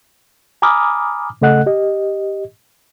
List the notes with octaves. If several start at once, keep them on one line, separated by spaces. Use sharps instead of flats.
G#5 A#5 B5 D6 D#6 F6
C#3 A3 A4 D#5 F#5 F#6
G4 D#5